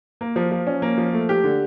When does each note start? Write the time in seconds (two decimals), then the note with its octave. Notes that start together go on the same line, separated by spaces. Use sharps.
0.21 A#3
0.36 F3
0.52 F3
0.67 C#4
0.82 A#3
0.98 F3
1.13 A3
1.29 G4
1.44 D3